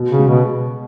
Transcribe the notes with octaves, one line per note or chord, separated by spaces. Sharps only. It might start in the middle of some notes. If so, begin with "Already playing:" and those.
Already playing: B2
C#3
G#3
B2